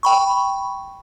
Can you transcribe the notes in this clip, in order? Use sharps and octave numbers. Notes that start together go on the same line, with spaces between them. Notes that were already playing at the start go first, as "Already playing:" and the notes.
G5 B5 C#6